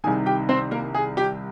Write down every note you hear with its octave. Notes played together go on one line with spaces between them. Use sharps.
C2 C3 D#3 G#4 G#5
G4 G5
C4 C5
A#3 A#4
G#4
G4